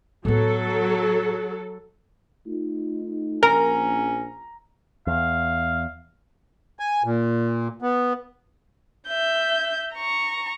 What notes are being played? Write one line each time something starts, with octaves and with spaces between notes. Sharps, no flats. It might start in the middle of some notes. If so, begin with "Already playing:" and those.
A2 F#3 B3 A4
A3 D#4 F4
A#1 C#4 A#4 A#5
E2 F5
G#5
A#2
B3
E5 G6
A#5 C#6